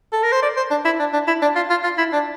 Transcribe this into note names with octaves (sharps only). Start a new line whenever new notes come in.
A4
A#4
C5
D5
C5
D4
E4
D4
D4
E4
D4
F4
F4
F4
E4
D4